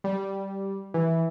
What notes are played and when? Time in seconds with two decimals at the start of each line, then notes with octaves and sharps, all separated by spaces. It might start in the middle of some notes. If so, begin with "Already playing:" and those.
0.04 G3
0.94 E3